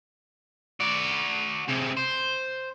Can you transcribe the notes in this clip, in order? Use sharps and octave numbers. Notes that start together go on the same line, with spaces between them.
F#4 D5
C3 G#3
C5